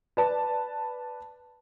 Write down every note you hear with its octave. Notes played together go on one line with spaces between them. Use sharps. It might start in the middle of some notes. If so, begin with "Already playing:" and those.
B4 D5 A5